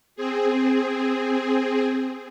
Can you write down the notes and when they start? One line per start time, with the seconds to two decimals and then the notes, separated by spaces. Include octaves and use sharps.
0.16 C4 G#4